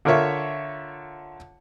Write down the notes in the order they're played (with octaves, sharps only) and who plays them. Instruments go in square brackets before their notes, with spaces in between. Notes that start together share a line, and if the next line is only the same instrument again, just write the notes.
[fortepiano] D3 F4 A#4 C#5 E5 C#6